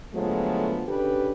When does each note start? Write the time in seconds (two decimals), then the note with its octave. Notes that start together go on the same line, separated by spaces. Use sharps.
0.13 D3 F3 F#3 G#3 A3 B3
0.87 C#3 D4 G4 A4 B4